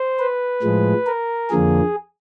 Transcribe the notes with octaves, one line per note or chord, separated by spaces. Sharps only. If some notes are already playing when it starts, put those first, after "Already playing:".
Already playing: C5
B4
A2 F3 G#3
A#4
F2 D3 F3 A#3 G#4